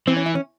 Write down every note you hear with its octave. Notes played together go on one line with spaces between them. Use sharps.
E3 C4
C#4
E4
C#4